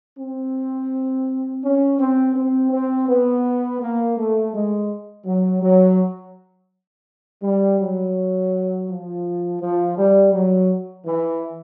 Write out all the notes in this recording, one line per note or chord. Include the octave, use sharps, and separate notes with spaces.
C4
C#4
C4
C4
C4
B3
A#3
A3
G#3
F#3
F#3
G3
F#3
F3
F3
G3
F#3
E3